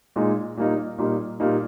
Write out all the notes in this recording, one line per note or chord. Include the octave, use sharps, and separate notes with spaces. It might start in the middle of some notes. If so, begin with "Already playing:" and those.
A#2 G#3 D#4
A#2 G3 A#3 D#4
A#2 G3 A#3 D#4
A#2 G3 A#3 D#4